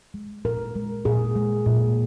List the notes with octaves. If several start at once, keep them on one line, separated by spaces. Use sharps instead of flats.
G#3
A#2 A#4
G#3
A#2 G#4
G#3
A#2